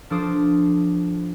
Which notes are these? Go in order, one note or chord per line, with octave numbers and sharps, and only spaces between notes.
F3 D4 A4 C5 D6 D#6